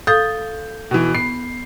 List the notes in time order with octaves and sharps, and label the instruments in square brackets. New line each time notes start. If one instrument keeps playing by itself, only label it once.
[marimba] A4 F5 D#6 [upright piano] G6
[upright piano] B2 E3
[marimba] B3 [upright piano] C7